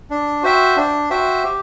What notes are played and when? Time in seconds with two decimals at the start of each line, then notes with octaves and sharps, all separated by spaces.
0.10 D4
0.43 F#4 C5 E5 G5
0.76 D4
1.10 F#4 C5 E5 G5
1.44 G4